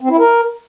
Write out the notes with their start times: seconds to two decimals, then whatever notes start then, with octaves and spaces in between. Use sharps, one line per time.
0.01 C4
0.10 E4
0.19 A#4